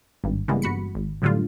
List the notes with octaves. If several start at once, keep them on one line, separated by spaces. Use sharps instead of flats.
G#1 G2
C#3 E3 G3 G#3 A#3 B3
G1 F#4 B5 C#7
G#1
F#2 A2 D3 G3 F4